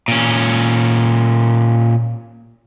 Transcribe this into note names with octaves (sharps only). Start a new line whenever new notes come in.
A#2 C#4